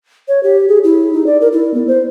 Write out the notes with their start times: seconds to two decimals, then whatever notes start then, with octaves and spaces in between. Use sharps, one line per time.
0.28 C#5
0.43 G4
0.69 G#4
0.84 E4
1.13 D#4
1.26 D5
1.41 A#4
1.53 E4
1.74 B3
1.87 C5